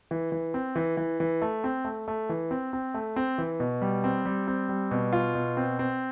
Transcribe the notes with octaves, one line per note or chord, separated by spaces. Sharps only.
E3
E3
C4
E3
E3
E3
A3
C4
A3
A3
E3
C4
C4
A3
C4
E3
B2
G3
C4
G3
C4
G3
B2
F4
B2
C4
C4